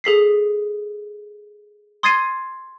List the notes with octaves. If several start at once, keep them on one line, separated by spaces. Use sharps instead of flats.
G#4 A4 B6 C7
C6 D#6 G#6 A6 C7 D#7